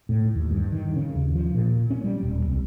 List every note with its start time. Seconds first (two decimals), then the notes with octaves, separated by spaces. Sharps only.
0.09 A2
0.36 D#2
0.51 G2
0.72 D#3
0.96 C#3
1.15 D#2
1.35 F3
1.55 A#2
1.90 C#4
2.04 G3
2.23 D#1
2.47 C2